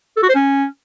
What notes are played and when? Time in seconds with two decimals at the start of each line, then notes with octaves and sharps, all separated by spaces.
0.17 A4
0.23 F#4
0.29 C5
0.35 C#4